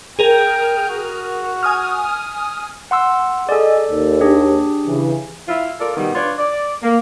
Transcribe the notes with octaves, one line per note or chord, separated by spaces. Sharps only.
G#4 A#4 G5
F#4
G#5 D#6 F6
F#5 C6 E6
G#4 A4 D5 D#5
D#2
D4 G4 G#4
C#3 E3
E4 F4
F4 A4 A#4 D5
B2 D#3 G3 B3
D4 F4 B4 C#5
D5
A#3